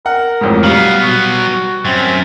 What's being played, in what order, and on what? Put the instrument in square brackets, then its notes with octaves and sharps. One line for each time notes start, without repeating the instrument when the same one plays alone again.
[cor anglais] A#4 [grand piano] F#5
[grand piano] A1 F2 G#2
[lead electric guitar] F#3 B3 [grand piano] G3 [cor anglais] F5
[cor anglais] F#4
[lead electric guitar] F#2 [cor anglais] C4